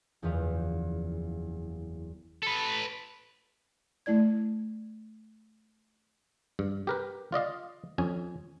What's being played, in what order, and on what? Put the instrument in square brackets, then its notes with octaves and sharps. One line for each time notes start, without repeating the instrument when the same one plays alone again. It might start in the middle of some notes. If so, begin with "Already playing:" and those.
[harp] F#1 E2 F3 B4 F5
[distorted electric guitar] A4 B4
[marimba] A3 E4 D5 G#6
[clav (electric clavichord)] G2
G4 A#4 B4
F4 D5 D#5 F5
F2 C#4 G#5